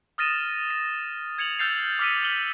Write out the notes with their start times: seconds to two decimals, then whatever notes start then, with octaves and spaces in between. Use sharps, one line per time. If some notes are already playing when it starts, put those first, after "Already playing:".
0.18 D#6 F6 A6 A#6 D#7 E7
0.70 A#6
1.38 G#6 C#7 F7 F#7
1.59 E6 F6 G6 A6 C7 F7
1.99 D6 E6 F6 B6 C#7 D#7
2.24 B6 F#7 G7